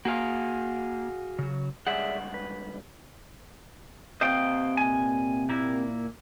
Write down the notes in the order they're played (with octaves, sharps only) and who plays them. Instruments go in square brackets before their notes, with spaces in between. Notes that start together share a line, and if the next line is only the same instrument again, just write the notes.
[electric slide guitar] A#3 [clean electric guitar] F#4 G#4 F5
[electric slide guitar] C#3 F#3
[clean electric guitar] C#2 G2 F#5 [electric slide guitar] G#4 D5 E5
[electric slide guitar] B4
[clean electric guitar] C3 D#5 [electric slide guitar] C5 F5 G5
[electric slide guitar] A#2 G#5
A#2 A#3 E4